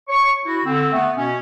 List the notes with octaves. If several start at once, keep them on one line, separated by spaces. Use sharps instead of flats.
C#5 C#6
E4 F#4
D3 C4
A3 B3
B2 B3 C#4